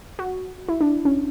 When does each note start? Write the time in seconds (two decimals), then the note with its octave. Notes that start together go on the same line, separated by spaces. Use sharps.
0.19 F#4
0.69 E4
0.81 D4
1.05 C#4